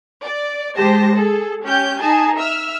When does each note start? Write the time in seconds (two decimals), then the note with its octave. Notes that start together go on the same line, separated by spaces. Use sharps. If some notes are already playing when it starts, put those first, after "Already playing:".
0.25 D5
0.77 G#3 G4 C5 A5 A#6
1.16 G#4 A4
1.65 C#4 G4 G6
2.00 D#4 G#4 G#5 A5
2.38 E5 E6 F6